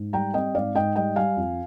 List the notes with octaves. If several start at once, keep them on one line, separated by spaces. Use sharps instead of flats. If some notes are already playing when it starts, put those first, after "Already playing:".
Already playing: G#2
G3 G5 A#5
C4 D#5 G5
G#2 D5 F5
G#2 D#5 G5
G3 D#5 G5
G3 F5 G#5
F2